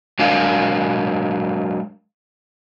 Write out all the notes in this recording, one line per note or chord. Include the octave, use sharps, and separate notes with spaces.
F#3 G#3 D4 A#4 F5